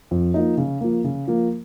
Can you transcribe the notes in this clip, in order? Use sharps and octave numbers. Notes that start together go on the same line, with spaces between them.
F2
F3 A#3 D#4
C#3
F3 A#3
C#3
F3 A#3